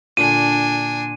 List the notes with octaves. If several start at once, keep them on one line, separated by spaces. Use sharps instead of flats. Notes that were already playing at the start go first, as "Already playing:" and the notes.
A#2 D3 D4 G#5 D#7